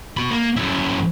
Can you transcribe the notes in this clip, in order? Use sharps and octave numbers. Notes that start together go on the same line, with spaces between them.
F#4 B5
A#3
F#2 E4